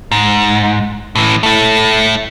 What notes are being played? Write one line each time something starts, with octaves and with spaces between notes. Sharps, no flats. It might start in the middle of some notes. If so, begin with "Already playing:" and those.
G#2
A2 E3
A3 E4